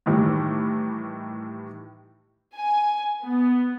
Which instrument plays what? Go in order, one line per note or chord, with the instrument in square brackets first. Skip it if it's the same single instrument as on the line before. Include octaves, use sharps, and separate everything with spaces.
[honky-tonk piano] A2 D#3 E3 G3
[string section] G#5
B3